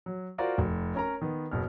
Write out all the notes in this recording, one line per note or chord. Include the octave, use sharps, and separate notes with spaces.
F#3
F4 F#4 A#4 C5 D5
F1
C#4 A#4 A#5
D#3 B3
F#1 B2 F6